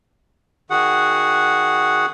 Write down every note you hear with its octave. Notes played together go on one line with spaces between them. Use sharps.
D#3 F#4 G#4 F#5